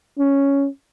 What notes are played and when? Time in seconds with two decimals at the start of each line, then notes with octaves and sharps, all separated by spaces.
0.18 C#4